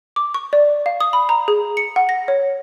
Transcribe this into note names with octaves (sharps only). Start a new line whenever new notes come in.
D6
C#6
D5
F5
D#6
B5
A#5
G#4
C#7
F#5
A#6
C#5